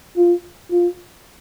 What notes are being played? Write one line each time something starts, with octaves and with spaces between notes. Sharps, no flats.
F4
F4